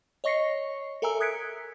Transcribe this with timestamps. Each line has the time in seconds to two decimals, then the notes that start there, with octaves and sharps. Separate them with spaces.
0.24 C#5 D#5 C#6 A#6 C7 C#7
1.02 A4 A#4 E5 G#5 A#5 E6
1.20 D#6 F#6 G#6 B6 C#7 D7